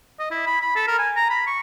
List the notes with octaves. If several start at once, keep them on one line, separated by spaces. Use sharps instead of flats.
D#5
E4
B5
B5
A4
A#4
G#5
A#5
B5
C#6